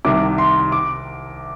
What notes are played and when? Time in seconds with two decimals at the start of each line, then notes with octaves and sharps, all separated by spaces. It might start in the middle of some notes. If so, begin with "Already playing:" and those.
0.05 C2 C3 D#3 D6
0.38 C6
0.72 D6